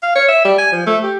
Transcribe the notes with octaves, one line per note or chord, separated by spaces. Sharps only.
F5
C#5
E5
G3
G#5
F3
A3
G4